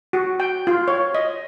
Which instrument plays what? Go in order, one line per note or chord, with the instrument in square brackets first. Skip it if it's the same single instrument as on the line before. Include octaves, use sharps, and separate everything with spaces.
[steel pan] F#4
G5
F4
C#5
D#5